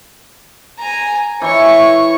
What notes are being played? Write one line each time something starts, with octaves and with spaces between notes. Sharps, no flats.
G#5 A#5
E3 C#5 C#6